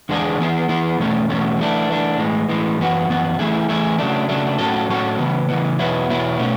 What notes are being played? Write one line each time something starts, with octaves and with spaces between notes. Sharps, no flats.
E2 D3 G#3 D4 G#4
E3 B3 E4 G#4
E3 B3 E4 G#4
E2 B2 F#3 A3 C#4
E2 B2 F#3 A3 C#4
E3 A3 D4
E3 A3 D4
A2 E3 G#3
A2 E3 G#3
F#2 E3 B3 F#4
F#2 E3 B3 F#4
E3 A3 E4 G#4
E3 A3 E4 G#4
C#3 F#3 A3 D4
C#3 F#3 A3 D4
A2 F#3 C#4 F#4 A4
A2 F#3 C#4 F#4 A4
C#3 E3 B3
C#3 E3 B3
E2 B2 F#3 B3 E4
E2 B2 F#3 B3 E4
B2 A3 C#4